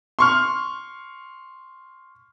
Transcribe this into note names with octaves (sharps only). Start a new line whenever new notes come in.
C6 C#6 F6